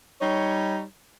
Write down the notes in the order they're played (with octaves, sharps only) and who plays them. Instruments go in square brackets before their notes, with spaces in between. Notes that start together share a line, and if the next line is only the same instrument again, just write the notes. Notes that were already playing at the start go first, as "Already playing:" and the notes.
[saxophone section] G3 D#4 C#5